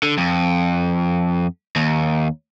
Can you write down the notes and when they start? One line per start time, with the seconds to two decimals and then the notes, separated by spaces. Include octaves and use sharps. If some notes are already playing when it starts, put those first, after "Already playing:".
0.03 D3
0.18 F2
1.76 D#2